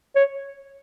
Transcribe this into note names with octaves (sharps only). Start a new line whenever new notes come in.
C#5